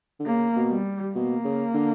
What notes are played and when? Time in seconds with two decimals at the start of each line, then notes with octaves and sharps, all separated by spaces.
0.20 D3
0.27 C#3 A#3
0.57 B2
0.70 G3
1.15 B2 A#3
1.45 C#3
1.74 D3